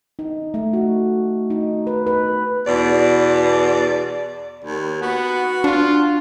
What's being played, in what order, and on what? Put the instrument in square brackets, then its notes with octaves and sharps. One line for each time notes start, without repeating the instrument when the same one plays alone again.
[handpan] D#4
A3
F#4
D#4
B4
B4
[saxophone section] E2 B2 D5
[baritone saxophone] D#2
[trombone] B3 [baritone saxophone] F#4
[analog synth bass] D4 [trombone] F4